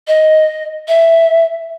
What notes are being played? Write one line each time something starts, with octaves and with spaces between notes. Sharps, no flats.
D#5
E5